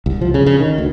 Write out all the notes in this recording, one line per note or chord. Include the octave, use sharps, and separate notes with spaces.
C2
F3
C#3
C#3
D#3
D2